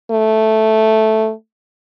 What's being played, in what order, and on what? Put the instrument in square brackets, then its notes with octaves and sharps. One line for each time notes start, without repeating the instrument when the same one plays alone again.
[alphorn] A3